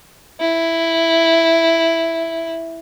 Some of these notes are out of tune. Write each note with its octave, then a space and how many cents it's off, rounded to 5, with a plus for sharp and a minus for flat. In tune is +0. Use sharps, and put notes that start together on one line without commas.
E4 +0